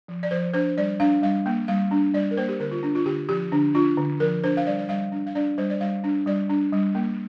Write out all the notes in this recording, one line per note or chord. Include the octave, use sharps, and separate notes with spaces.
F3
D5
F3 C5
D4 C5
G3 D5
D4 F5
G3 F5
A#3
G3 F5
D4
G3 D5
A#4
A#3 C5
G4
D3 A#4
F4
D4
F4
D3 G4
F3 G4
D3 D4
D4 F4
D3
F3 A#4
D4 C5
F5
G3 D5
D5
G3 F5
D4
F5
D4 D5
G3 C5
D5
G3 F5
D4
G3 D5
D4
G3
A#3